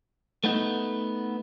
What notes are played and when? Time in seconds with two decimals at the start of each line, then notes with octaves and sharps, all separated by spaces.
0.44 A3 B3 D#4